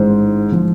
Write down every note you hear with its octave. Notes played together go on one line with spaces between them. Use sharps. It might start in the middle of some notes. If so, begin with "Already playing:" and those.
Already playing: A1 G#2 D#3 G#3 C5
F3